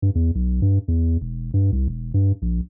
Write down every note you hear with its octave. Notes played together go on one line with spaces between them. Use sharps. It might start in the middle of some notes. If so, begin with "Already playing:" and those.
G2
E2
B1
G2
E2
E1
G2
C2
E1
G2
A#1